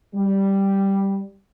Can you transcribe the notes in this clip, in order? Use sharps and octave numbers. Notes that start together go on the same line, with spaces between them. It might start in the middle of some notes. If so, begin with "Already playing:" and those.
G3